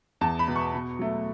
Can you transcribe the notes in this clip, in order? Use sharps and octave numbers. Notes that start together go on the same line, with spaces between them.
E2 A5
B5
B2 B3
C#6
B2
F#3 A3